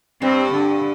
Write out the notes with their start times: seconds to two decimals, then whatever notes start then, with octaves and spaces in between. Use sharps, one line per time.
0.22 G2 C4
0.52 D3